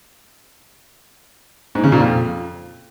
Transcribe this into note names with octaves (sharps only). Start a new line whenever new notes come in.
G#2
C#3
A#2
F2